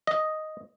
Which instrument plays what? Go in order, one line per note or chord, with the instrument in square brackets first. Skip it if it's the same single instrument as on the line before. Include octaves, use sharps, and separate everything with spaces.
[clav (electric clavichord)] D#5